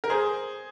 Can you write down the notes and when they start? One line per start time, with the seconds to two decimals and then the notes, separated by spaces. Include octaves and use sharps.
0.04 A#4
0.10 G#4 C5